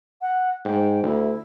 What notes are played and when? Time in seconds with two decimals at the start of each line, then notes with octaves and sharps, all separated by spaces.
0.21 F#5
0.65 G#2 G5
1.03 D2 E4